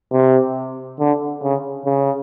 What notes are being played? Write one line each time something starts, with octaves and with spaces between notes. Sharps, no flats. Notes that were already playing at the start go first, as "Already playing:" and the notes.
C3
D3
C#3
C#3